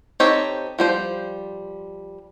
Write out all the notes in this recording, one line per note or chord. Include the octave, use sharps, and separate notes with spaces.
C4 D#4 G4 A4 C#5
F3 G3 C5